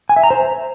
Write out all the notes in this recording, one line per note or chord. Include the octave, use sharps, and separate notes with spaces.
G#5
E5
A#5
C5